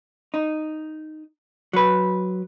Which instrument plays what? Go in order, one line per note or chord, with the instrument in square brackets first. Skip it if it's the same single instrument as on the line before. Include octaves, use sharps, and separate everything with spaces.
[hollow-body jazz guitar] D#4
F#3 B4